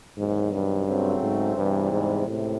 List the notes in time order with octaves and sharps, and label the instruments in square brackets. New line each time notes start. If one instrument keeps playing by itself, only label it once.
[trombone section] E2 C3 D#3 F#3 [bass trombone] G#2
[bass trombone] G2
[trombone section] C#3 F#3 A3 C4
[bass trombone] G#2
[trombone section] E2 C3 E3 G3 [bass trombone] G2
[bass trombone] G#2
[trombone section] C#2 C3 [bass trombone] A2